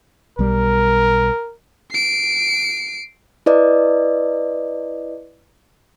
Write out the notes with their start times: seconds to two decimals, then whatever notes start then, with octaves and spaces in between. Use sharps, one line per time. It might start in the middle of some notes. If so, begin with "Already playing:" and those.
0.39 B1 G3 A#4
1.91 C7 D7
3.46 E4 B4 D5 D#5